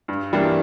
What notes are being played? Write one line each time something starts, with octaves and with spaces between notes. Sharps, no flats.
G2
E3 G3 A#3 D4